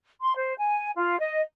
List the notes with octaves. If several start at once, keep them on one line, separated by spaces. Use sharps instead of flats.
C6
C5
G#5
F4
D#5